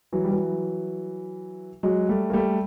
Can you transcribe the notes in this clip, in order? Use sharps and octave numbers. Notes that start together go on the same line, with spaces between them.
E3 F#3
G3
E3 F#3
F#3 G#3
G3 A3
A#3
G3 A3